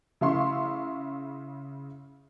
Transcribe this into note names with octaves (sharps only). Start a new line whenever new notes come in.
C#3 E4 E5 F5 C6 C#6